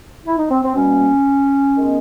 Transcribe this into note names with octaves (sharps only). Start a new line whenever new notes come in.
E4
D#4
C4
C4
B2 G3 A#3 C#4
D#3 G#3 B3